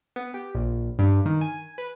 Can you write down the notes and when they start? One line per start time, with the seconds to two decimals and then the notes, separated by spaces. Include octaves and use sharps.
0.16 B3
0.34 G4
0.55 A#1
0.99 G2
1.26 D#3
1.41 G#5
1.78 B4